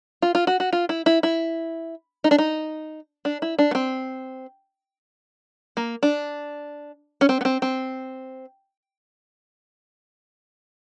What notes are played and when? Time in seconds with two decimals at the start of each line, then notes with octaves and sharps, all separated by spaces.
0.22 F4
0.35 F4
0.47 F#4
0.60 F#4
0.73 F4
0.89 E4
1.06 E4
1.23 E4
2.24 D#4
2.31 D4
2.38 D#4
3.25 D4
3.42 E4
3.59 D4
3.71 B3
3.75 C4
5.77 A#3
6.03 D4
7.21 C#4
7.29 C4
7.41 B3
7.45 C4
7.62 C4